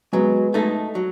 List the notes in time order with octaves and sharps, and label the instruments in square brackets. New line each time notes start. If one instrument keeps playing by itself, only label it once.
[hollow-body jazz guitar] F#3 [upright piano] G#3 B3
[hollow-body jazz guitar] A3 D#4 A4
F#3